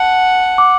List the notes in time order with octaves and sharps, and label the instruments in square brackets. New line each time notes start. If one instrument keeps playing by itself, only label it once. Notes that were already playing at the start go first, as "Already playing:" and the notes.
Already playing: [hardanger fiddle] F#5 [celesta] A5
[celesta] D6